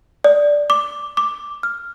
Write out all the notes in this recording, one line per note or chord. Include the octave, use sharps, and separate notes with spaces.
D5
D6
D6
F6